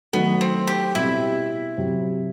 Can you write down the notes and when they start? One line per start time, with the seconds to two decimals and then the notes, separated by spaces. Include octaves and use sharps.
0.13 D#3 F#3 A3 B3
0.41 C4
0.67 G4
0.95 B2 G3 C4 E4
1.77 C3 F#3 C4